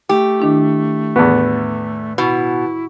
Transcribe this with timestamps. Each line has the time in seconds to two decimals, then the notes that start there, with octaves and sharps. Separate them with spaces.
0.09 A3 G4
0.40 D#3 D4 E4
1.16 E2 A2 B3
2.18 B2 E4